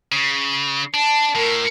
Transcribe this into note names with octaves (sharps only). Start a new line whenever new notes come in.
C#3
D4 A5
A2 A#4